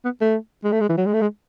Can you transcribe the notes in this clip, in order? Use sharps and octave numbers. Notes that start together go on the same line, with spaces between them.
B3
A3
G#3
A3
G#3
E3
F#3
G#3
A3
G#3